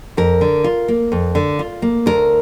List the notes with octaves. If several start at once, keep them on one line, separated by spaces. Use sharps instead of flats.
F2 A#4
D3
F4
A#3
F2
D3
F4
A#3
D2 A#4